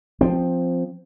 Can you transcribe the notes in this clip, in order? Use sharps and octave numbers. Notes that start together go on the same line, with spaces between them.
F3 C4